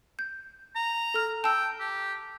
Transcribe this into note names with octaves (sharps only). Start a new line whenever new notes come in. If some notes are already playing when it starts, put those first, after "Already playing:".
G6
A#5
A4 F6
G5 A5 E6
G4